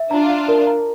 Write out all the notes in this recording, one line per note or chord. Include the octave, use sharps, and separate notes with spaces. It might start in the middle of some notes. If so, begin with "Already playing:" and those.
Already playing: E5
D4 F4 A#5
F5
A#4
A#5